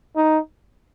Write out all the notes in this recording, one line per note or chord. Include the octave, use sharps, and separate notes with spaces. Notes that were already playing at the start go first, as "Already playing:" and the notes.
D#4